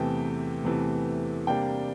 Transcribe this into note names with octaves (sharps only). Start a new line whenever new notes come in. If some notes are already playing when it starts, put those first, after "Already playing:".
Already playing: E2 C3 E3 A3 G5
E2 C3 E3 A3
C3 G3 A#3 D4 G5